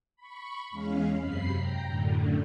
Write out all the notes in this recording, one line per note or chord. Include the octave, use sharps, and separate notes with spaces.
B5 C#6
E2 G#3 C#4 F5
F#2 C3 B5 C7
G5 A#5
F#2 A2 D3